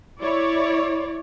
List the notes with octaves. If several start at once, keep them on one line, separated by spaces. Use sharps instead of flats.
E4 C#5 D5